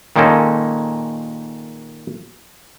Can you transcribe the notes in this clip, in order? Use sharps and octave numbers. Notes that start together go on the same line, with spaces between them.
A#2 D#3 G#3 A#3 C#4 A4